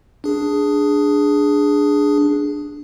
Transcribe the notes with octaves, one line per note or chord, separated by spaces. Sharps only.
D4 G#4